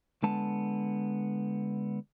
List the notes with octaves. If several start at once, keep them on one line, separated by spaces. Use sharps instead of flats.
D3 G#3 B3 A5